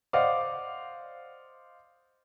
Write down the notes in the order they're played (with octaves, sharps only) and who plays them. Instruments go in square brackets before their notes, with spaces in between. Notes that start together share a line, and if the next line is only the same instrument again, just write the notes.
[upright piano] C5 D5 D#5 F5 F#5 D6